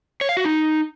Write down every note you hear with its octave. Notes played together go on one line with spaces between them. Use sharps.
C#5
F5
F#4
D#4